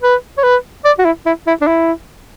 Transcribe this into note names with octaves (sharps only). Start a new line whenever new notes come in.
B4
C#5
B4
D5
F#4
E4
E4
E4
D4
E4